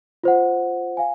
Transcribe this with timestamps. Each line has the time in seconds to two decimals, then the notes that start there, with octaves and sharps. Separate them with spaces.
0.23 F4 C5 F#5
0.97 F5 G#5